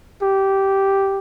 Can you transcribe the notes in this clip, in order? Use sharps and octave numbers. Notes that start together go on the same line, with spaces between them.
G4